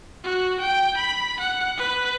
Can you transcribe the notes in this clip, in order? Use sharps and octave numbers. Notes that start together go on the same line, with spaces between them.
F#4
G5
B5
F#5
B4